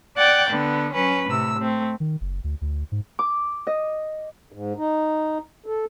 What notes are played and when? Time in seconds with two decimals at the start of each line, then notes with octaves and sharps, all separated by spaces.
0.18 D5 F#5 G5 F#6 A6
0.50 D3 B3
0.94 F#3 C#4 B4
1.28 A2 C3 E6
1.59 A3 C4
2.00 D#3
2.21 F#1
2.44 D2
2.61 D2
2.92 G#2
3.19 D6
3.67 D#5
4.52 G#2
4.77 D#4
5.66 A4